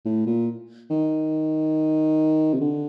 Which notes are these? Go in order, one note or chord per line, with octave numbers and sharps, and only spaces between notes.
A2
A#2
D#3
C3
D3